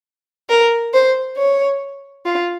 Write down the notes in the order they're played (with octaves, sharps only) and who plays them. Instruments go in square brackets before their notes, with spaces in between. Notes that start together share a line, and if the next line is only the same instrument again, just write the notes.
[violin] A#4
C5
C#5
F4